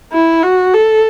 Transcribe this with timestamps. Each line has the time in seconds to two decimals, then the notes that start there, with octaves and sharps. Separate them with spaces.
0.12 E4
0.43 F#4
0.74 A4